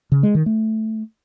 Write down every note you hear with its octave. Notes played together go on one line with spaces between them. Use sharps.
C#3
G#3
D#3
A3